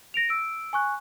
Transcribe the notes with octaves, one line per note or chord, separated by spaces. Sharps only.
A#6 D7 F7
E6 D7
G#5 C#6 F#6